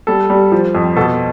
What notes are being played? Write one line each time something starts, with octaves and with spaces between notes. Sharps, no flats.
G3 A4
G3
F3
F2
B2 A4